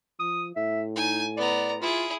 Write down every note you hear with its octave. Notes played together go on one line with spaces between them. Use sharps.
F3 D#6
A2 E5
D#4 G#5
B3 D5 A#5
E4 F4 G#4